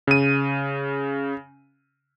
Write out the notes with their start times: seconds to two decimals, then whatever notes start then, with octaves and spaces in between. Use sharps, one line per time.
0.07 C#3 D#7